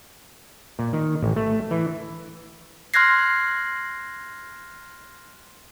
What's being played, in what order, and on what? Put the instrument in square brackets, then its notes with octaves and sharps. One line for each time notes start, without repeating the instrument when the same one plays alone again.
[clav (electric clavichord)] A#2
D#3
A1
A3
E3
[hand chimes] C6 F6 F#6 G#6 A#6 C7